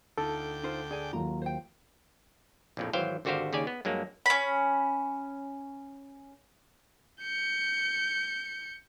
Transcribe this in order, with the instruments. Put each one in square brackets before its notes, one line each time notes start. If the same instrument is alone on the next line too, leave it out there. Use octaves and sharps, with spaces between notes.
[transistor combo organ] D2 G5 D6 [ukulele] D#4 F4 [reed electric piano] A4
[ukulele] D#4 F4 C5
[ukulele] G#4 G#5 [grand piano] D5
[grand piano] D#2 F#3 F4 [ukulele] A#5
[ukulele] C5 G5
[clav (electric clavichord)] A#1 F2 A2
G#1 E3 F#3 C5 F5 G5
G#1 D3 F#4 G4 C5 F5
D#2 C#3 G4 D5 G#5
B3
G2 F#3 G#3 A#3
[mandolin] C#4 B5
[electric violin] G6 C#7